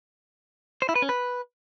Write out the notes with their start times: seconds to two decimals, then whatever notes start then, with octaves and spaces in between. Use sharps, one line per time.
0.82 C5
0.89 E4
0.96 B4
1.02 C#4
1.09 B4